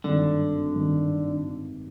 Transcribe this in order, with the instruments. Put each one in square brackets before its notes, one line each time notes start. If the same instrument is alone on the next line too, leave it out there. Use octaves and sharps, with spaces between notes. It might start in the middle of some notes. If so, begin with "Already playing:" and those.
[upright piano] G#1 G2 D#3 [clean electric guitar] D3
[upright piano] G#1 G2 D#3